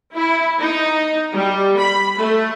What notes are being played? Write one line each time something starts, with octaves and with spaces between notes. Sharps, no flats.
E4
D#4
G3
B5
A3